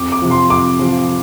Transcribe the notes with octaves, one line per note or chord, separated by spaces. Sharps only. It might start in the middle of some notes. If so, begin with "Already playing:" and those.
Already playing: F2 D6
D6
C3 F3
C6
F2 D6
C3 F3